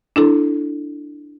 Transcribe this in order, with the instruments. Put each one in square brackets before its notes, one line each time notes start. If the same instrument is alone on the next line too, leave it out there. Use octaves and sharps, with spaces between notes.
[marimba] D4 E4 A4